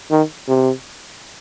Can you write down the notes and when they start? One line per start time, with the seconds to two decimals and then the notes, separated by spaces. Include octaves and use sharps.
0.11 D#3
0.48 C3